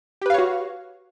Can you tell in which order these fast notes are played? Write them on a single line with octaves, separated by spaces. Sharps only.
G4 B4 F5 C#5 F#4